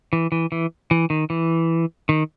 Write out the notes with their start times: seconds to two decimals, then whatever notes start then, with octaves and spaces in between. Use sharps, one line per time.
0.13 E3
0.32 E3
0.52 E3
0.91 E3
1.10 D#3
1.30 E3
2.09 D#3